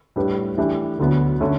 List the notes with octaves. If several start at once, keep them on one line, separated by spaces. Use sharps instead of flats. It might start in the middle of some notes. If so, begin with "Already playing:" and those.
A2 G3 D4 G4 B4
E3 A3 D4 G4
D2 D3 F#3 B3
D3 A3 C#4